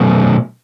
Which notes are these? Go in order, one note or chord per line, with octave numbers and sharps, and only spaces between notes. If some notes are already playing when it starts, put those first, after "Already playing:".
Already playing: B2 F#3 A3